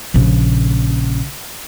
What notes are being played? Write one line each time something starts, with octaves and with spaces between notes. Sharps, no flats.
A#1 C#3